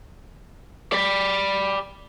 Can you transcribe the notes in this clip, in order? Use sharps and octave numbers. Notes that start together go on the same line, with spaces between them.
D5 B5